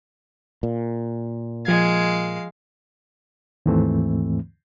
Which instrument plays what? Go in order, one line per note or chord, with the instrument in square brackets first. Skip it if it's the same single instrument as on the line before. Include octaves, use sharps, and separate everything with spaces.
[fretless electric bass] A#2
[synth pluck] F3 G#6 [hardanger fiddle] G#3 F5
[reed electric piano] D#2 G#2 E3 A3 C4